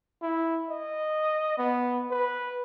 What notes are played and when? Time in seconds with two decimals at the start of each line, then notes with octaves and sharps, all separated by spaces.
0.22 E4
0.70 D#5
1.58 B3
2.11 B4